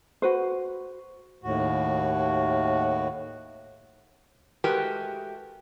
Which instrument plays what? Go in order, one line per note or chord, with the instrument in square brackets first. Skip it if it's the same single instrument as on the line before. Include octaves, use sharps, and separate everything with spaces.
[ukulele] F#4 B4 C5
[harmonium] D#2 A2 F#4
[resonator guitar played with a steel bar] G#3 A3 F#4 G4 A#4 B4